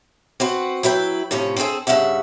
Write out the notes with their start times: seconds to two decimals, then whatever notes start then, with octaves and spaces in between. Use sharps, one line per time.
0.40 C4 F#4 B4
0.83 F#3 E4 B4 G5
1.31 A2 C3 F3 C#4
1.57 C4 F4 F#4 G#4 A4
1.87 G2 C#3 G#3 C#4 E5 F#5